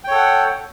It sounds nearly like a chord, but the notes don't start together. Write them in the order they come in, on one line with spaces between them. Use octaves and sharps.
G5 C#5 A4 F#5